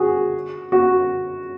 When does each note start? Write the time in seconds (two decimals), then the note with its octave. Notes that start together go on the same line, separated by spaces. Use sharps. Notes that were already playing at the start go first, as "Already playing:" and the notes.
Already playing: F#4 G#4
0.72 F#4